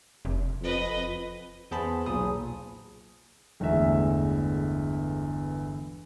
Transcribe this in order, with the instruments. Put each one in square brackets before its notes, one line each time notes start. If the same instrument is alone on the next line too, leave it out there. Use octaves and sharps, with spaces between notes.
[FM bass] F1
[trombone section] F2 [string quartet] B4 D#5
[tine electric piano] E2 B3 G#4 C5 A5 B5
B1 A#2 G#4 D#6
[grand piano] G1 E2 G#3 A3 E5